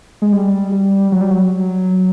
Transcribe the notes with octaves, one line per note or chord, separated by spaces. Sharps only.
G#3
G3
G3
F#3
G3
F#3